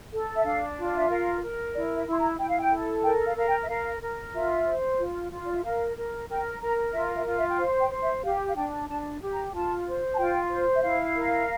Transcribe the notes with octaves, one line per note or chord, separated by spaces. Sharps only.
A4
E5
D4 F5
F4
D5
E5
A#4 F5
A#4
E4 D5
E5
E4
C6
A#5
E4 G5
F5
G5
A4
A#4 G5
F5
A#4 F5
G5
E5
A#4 F5
A#4
F4 E5
C5
F4
F4
D5
E5
A#4 F5
A#4
A#4 G5
A#4 A#5
F4 E5
E5
F4
E5
G5
C5 F5
G5
C5
E5
G4 F5
F5
D4 G5
D4 A5
G4
A#5
F4 A5
C5
A5
F4 G5
C5
E5
E4 F5
A#4